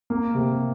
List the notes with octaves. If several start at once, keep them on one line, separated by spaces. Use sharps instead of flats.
A#3
C3